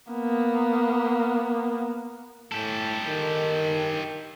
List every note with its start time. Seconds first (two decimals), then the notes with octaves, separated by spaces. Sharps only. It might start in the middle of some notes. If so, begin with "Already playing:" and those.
0.13 A#3 B3
2.52 A2 G4 A4
3.06 D#3